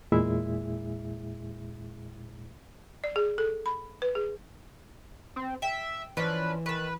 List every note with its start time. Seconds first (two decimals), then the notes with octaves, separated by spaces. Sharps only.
0.12 E2 A#2 G#3 E4 G#4 E5
3.04 D5
3.16 G#4
3.38 A4
3.66 B5
4.02 B4
4.15 G#4
5.36 C4
5.62 E5 G5
6.17 E3 F3 C#4 D4 B4
6.66 D#3 B4 A5